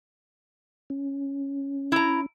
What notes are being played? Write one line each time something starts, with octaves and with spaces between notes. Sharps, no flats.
C#4
E4 A#5